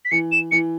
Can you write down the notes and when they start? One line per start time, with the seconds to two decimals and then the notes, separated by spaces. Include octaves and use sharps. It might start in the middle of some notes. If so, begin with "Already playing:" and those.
0.05 B6
0.11 E3 C#7
0.32 E7
0.51 E3 C#7